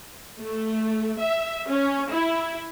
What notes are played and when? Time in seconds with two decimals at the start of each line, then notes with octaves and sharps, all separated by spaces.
0.38 A3
1.18 E5
1.69 C#4
2.11 E4